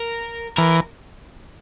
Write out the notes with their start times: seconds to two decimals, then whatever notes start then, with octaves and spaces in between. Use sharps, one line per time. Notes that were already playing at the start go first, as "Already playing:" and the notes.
Already playing: A#4
0.57 E3 A#4